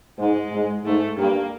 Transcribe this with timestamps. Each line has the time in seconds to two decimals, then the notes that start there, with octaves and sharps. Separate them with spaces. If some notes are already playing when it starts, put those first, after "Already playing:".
0.19 G#2 G#3
0.52 G#2
0.85 G#2 A3
1.17 G2 A#3